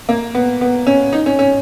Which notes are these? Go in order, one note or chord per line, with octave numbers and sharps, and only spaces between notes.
A#3
B3
B3
C#4
D#4
C#4
C#4